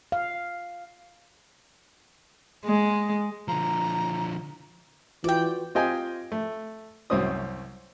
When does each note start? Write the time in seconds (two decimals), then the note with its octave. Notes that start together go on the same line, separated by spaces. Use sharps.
0.12 F5
2.65 G#3
3.48 D3 F3 A#5
5.24 E3 F4 F#4 B4 D5 G5
5.75 C4 F4 G4 D#5 G5 G#5
6.32 A3
7.10 C2 F#2 C4 C#4 D#6